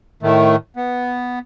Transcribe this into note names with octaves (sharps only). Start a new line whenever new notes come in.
A2 D#3 A3
B3